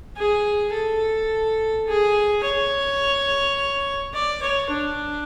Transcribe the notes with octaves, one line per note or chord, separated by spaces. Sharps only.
G#4
A4
G#4
C#5
D5
C#5
D4